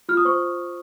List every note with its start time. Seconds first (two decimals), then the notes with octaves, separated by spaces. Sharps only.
0.09 F4 F6
0.17 D#6
0.25 C5 C#6